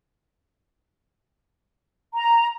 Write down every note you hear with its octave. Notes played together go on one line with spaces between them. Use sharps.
A#5